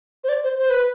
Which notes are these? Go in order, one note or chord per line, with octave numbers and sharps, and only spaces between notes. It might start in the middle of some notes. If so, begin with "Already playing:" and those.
C5
D5
C5
C5
B4